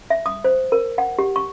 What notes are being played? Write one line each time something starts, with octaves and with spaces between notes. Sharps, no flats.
E5
D#6
C5
A#4
F#5
G4
C#6